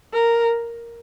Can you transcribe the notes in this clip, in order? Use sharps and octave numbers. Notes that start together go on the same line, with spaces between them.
A#4